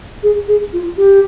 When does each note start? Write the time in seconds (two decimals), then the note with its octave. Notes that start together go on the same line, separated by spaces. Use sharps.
0.23 G#4
0.48 G#4
0.73 F4
0.97 G4